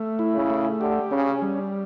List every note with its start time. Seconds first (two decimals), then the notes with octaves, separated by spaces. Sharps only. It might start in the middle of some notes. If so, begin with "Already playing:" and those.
Already playing: A3
0.19 E4
0.35 C#3
0.50 A3
0.80 D3 G4
1.11 C#3 C#4
1.42 G3